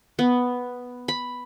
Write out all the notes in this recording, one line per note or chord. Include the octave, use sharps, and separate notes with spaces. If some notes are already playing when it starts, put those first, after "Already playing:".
B3
B5